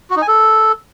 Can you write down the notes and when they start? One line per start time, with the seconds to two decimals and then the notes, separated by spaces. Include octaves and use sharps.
0.10 F#4
0.16 D#4
0.22 G#5
0.28 A4